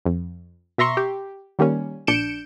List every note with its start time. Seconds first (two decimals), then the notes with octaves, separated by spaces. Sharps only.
0.06 F2
0.78 B2 E5 A#5 C6 C#6
0.97 G4
1.59 D#3 G3 A#3 C#4
2.07 A#1 D4 G6 C#7 D7 E7